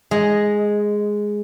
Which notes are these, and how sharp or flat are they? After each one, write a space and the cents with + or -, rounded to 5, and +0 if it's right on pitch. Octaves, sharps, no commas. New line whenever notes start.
G#3 +0 D#5 +0 A#5 +0